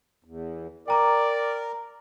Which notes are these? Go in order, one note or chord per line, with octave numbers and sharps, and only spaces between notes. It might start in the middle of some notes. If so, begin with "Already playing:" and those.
E2
A#4 D5 G5 A#5 D6